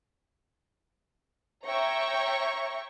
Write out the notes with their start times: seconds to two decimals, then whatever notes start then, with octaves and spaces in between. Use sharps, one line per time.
1.64 C#5 E5 G5 A#5 C#6